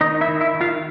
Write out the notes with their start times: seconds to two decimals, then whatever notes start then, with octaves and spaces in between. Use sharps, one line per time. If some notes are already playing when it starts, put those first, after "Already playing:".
0.01 D#3 D#4 D#5
0.21 E4 E5
0.28 D#3
0.41 E4 E5
0.54 D#3
0.61 F4 F5